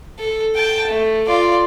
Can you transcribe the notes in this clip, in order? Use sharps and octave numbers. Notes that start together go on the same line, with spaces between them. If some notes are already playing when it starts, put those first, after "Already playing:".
A4
G5 A5
A3
F4 D5